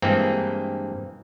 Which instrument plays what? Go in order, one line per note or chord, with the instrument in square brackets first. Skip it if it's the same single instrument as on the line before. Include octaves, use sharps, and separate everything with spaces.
[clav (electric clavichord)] G2 E3 G#3 A#3 C4